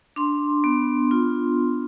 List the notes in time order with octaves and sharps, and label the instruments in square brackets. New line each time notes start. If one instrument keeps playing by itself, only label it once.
[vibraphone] D4 C6
B3
F4